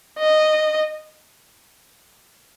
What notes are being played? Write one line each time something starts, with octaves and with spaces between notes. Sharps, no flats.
D#5